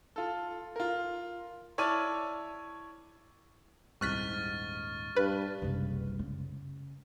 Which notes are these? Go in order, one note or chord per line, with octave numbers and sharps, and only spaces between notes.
F4 A4
F4 A#4
E4 C#5 D5 A5 F6 D#7
D#1 C2 G#2 C#6 F6 F#6 A6 B6
G2 B4
F#1 C2
C#3